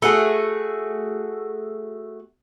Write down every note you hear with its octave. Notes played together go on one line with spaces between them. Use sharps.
A3 F#4 G#4